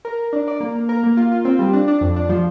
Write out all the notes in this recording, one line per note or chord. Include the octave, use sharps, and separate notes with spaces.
A#4
A#4
D4
D5
A#3
A#3
A#4
A#3
F4
F4
C4
G3
D4
D4
F2
D4
F3